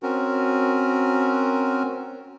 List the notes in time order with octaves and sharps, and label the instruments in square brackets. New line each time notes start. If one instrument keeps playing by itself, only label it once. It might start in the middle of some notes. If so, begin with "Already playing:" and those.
[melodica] C4 C#4 F#4 A#4